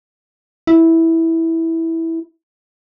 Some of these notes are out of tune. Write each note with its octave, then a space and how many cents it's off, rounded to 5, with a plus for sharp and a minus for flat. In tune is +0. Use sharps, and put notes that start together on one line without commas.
E4 -10